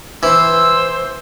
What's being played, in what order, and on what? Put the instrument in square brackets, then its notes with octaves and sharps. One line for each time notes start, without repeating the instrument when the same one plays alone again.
[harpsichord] E3 [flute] C5 [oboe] E6